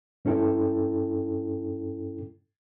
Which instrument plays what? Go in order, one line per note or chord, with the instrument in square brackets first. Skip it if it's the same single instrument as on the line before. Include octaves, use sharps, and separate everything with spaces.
[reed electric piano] G2 C#4 E4 A4 G5